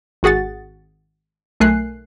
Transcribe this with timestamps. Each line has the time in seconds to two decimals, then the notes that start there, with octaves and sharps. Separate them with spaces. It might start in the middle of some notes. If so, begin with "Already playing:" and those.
0.23 G#1 F#4 G#4 F#5 A6
1.60 B1 A3 A#4 G#5 F#6 C7